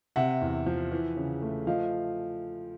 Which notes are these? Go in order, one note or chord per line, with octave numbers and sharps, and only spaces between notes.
C3 E5 F#5
E2
F3
E3
C#3
A3
F3 D#5 F5